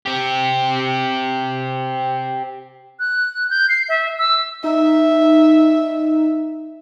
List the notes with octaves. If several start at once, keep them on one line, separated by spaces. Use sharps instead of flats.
C4 G4
F#6
G6
C7
E5
E6
D#4 E5